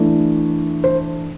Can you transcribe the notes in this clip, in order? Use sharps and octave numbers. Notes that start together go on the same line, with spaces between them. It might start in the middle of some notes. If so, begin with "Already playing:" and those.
Already playing: E3 A3 D4
C5